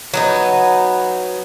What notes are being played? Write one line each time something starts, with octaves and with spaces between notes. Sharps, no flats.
F#3 B3 D#4